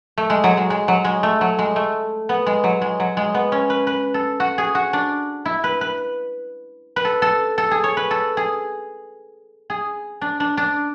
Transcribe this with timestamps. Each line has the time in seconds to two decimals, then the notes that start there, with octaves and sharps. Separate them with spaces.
0.18 A3
0.30 G#3
0.44 F#3
0.57 G#3
0.70 G#3
0.88 F#3
1.05 G#3
1.23 A3
1.41 F#3
1.59 G#3
1.76 A3
2.29 B3
2.46 G#3
2.64 F#3
2.82 G#3
3.00 F#3
3.17 G#3
3.34 B3
3.52 C#4
3.70 B4
3.87 B4
4.14 A4
4.40 F#4
4.58 G#4
4.75 F#4
4.93 D4
5.46 E4
5.64 B4
5.81 B4
6.96 B4
7.05 A4
7.22 A4
7.58 A4
7.71 G#4
7.84 C#5
7.97 B4
8.11 A4
8.37 G#4
9.70 G#4
10.21 D4
10.40 D4
10.57 D4